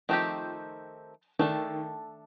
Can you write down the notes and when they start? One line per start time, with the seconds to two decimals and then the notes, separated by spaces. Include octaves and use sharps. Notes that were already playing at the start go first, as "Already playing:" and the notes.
0.09 D#3 F3 A3 C4 D#4 G4
1.39 D#3 A3 D4 A4